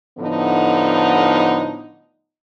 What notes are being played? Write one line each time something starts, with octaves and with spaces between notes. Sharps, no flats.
A2 D3 F3 B3 D#4